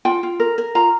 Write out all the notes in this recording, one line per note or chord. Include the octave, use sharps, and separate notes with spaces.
F4 G5
F4
A#4
A#4
F4 A#5